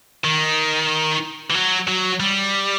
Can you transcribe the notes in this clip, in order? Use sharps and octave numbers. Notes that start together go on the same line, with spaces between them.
D#3
E3
F#3
F#3
G3